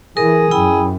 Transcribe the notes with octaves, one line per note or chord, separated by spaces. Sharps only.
E3 G#4 A#4
F#2 E4 G5 B5